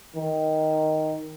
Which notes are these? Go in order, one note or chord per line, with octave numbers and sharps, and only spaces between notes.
D#3